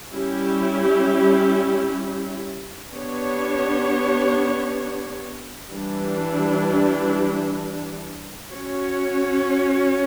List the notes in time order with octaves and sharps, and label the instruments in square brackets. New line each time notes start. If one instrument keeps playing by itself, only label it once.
[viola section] G3 C#4 E4 G4
B3 D4 G4 C#5
E3 G3 D4
C#4 F#4 C#5